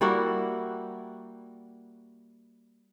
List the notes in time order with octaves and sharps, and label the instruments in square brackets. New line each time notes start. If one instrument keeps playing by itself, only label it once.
[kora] G3 A#3 E4 F#4